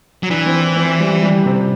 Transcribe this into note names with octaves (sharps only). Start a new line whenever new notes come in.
F#3
E3 D4
C4
C4
G3
G3
C3